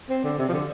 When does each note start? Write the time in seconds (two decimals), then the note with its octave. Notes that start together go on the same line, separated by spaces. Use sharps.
0.10 C4
0.24 D3
0.38 C3
0.49 F3
0.53 D3